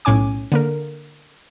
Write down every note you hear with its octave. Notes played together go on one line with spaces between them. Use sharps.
B1 A2 C#4 G#5 D6
D3 A#3 A#4